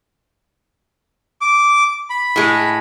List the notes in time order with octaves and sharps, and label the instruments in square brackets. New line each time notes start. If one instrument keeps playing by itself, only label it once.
[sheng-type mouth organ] D6
B5
[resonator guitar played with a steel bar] A2 G#3